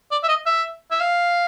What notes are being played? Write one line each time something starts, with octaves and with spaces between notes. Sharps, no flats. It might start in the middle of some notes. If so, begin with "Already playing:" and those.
D5
E5
D#5
E5
E5
F5